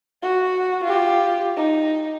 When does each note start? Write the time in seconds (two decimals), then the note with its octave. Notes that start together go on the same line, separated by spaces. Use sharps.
0.22 F#4
0.84 F4 G4
1.57 D#4